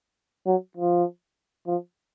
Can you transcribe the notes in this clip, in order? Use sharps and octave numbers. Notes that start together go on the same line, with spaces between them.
F#3
F3
F3